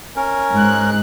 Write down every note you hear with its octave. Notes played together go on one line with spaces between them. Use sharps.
C#4 A#4
G#2 F#6